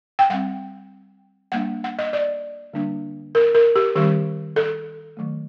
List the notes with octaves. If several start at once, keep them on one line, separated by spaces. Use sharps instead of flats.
G5
G3 C4 F#5
G3 A#3 D4 F#5
F#5
D#5
D5
D3 G3 A#3 D4
A#4
A#4
G4
D#3 G3 C4 G4
A4
D#3 F#3 A3